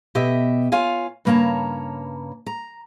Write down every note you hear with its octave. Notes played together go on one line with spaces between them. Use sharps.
B2 G4 D#5 E5
F4 C#5 F5 G#5
G2 C#3 A#3 C#5 A5 A#5
A#5